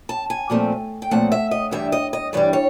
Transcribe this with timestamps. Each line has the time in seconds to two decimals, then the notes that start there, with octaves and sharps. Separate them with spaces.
0.09 A5
0.30 G#5
0.50 A#2 F3 A3 C4
1.02 G5
1.11 A#2 F3 A3 C4 F#5
1.32 E5
1.51 D#5
1.71 G2 E3 G3 E5
1.92 D#5
2.13 D#5
2.33 G2 E3 G3 D5
2.53 C#5